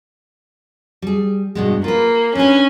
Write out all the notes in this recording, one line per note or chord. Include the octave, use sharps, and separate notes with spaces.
G3 G#4
G2 B2 G#3
A#3 F4 B4
C#4 D4 B4 G#5